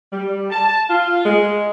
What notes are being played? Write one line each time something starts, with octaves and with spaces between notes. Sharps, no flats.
G3
A5
F4
G#3